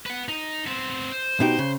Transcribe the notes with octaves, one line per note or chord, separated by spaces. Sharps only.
B4 F#5
D#4
B3 C4
C5
B2 D#4 G4
C#3